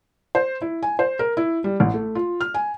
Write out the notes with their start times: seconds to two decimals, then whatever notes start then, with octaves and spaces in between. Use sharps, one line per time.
0.35 C5
0.61 E4
0.83 G#5
0.99 C5
1.19 A#4
1.37 E4
1.64 G3
1.80 A1
1.94 A3
2.15 F4
2.41 F6
2.54 G#5